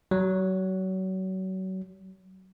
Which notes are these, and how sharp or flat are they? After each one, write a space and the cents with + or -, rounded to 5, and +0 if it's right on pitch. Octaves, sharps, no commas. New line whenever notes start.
F#3 +30